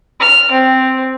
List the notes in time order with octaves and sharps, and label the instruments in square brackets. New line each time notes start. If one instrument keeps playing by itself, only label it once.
[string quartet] F6
C4